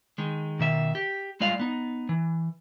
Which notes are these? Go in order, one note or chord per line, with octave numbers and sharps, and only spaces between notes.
D#3 G#3
B2 D#3 E5
G4
G3 G#3 F4 D5 F5
B3 D#4
E3